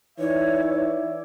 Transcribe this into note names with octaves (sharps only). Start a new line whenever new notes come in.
E3 D#4 C#5 D5 E5